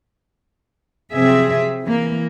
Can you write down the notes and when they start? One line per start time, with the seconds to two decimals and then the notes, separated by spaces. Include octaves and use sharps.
1.13 C3 F3 F#3 C4 G#4 E5
1.83 E3 A#3